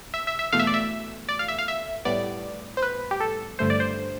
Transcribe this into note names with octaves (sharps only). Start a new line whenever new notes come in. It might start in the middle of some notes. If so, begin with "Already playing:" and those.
E5
E5
E5
E2 B2 A3 F5
E5
D5
E5
D5
F5
E5
F5
E5
A2 G3 B3 D5
C5
B4
G4
A4
G2 D3 A3 C5
D5
C5